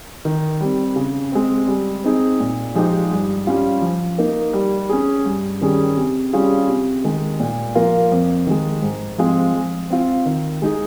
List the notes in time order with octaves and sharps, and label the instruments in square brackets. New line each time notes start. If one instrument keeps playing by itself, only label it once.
[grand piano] D#3
G3 C4
C#3
G#3 C4
G3
C4 D#4 G#4
A#2
F3 G#3 D#4 G4
G2
G3 C#4 F4
F3
A#3 D#4 A#4
G3
C#4 G#4
G2
D#3 G3 C#4 G#4
C3
G3 C#4 F4 G#4
C3
D#3 G#3
A#2
F3 A#3 F4 A#4
F2
D#3 G#3
G#2
F3 G#3 C4 F4
F3
C4 F4
D#3
G#3 D#4 G#4